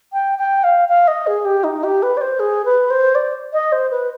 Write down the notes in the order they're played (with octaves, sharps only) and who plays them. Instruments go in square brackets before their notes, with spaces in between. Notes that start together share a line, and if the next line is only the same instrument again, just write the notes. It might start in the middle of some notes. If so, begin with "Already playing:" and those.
[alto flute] G5
G5
F5
F5
D#5
G#4
G4
D#4
G4
B4
D5
C5
G#4
B4
C5
D5
D#5
C5
B4